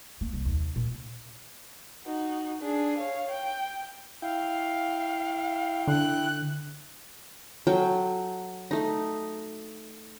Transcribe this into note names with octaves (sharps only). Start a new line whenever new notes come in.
A#3
C2
D#2
A#2
D#4 F#4
D4 G#4
C#5 F5
G5
E4 F5 G5
D3 F#6
F#3 A4 G5
A3 D#4